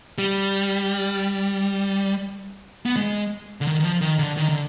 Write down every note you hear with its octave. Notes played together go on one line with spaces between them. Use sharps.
G3
B3
G#3
D3
D#3
D#3
F3
D#3
D3
D#3
D3